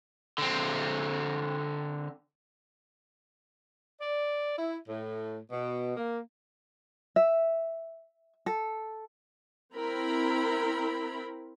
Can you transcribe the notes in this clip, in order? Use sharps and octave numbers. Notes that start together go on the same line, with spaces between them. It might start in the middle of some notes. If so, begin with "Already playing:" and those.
D3 C4
D5
E4
A2
B2
A#3
E5
A4
C4 E4 A#4 A#5 B5